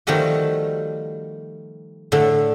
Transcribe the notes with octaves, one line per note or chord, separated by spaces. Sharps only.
D#3 F3 G3 A3 F#4
A2 D3 A3